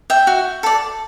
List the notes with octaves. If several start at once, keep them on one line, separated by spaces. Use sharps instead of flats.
E5 G5
F#4
A4 D5